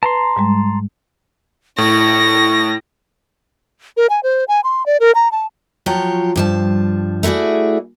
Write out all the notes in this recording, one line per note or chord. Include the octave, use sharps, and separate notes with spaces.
B4 A5 A#5 C6
G#2 G3 G#3
A2 E4 C#6 A#6
A#4
G#5
C5
G#5
C6
D5
A#4
A#5
A5
F3 F#3 F4 C#5 G5
G2 F3 A5
A3 E4 F#4 G#4 D5